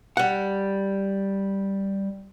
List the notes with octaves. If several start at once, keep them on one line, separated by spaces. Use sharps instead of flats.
G3 F#5